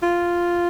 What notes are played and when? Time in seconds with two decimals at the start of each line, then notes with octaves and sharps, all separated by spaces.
0.03 F4